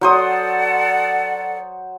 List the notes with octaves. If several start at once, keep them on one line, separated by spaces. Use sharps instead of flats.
F#3 A4 C5 D5 F#5 D#6